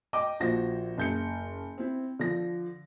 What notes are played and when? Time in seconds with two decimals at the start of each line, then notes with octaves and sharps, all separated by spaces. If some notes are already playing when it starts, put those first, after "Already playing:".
0.13 D#5 G5 D6
0.40 A#1 F3 F#4 C5 A#6
0.98 F#1 G6 C#7
1.78 C4 E4
2.19 D3 F3 A#6